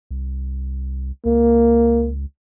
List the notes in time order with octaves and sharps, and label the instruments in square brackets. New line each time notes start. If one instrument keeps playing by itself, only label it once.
[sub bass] C2
[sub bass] C#2 [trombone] A#3